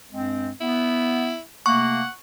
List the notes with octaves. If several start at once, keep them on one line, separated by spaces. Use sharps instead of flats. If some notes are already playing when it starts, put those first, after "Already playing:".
G2 G#3 C4
B3 E4
C3 A3 A#3 F#5 C#6